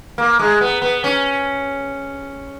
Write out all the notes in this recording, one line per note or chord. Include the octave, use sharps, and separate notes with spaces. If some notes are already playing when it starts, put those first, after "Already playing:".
A#3
G#3
B3
B3
C#4